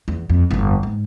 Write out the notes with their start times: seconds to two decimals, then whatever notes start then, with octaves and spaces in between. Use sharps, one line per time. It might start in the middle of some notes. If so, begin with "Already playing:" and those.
0.08 E2
0.30 F2
0.51 G1 F2
0.83 G#2